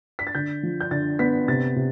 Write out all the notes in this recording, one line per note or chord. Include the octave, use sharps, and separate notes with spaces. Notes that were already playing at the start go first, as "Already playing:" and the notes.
B6
A6
D3 G6
F3
G6
D3 A6
B3 B6
C3 A6
C3